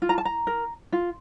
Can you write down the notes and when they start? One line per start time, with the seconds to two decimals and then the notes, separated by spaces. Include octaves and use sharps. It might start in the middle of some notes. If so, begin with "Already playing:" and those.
0.02 F4
0.09 A#5
0.18 A5
0.25 A#5
0.47 A#4
0.92 F4